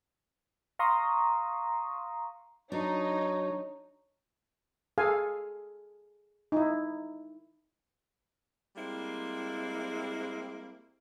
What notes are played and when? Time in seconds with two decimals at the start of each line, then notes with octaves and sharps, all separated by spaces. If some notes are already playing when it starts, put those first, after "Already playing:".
0.79 F5 A#5 C6 C#6 D#6
2.72 F#3 D4 D#4 C#5
4.98 G#4 A4 F5 G#5
6.52 D#4 E4
8.76 G3 G#3 A#3 C4 E4